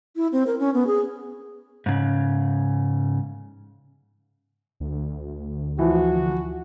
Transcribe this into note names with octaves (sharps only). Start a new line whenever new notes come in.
E4
C4
A#4
C#4
B3
G#4
G#2 C#3
D2
E3 F3 F#4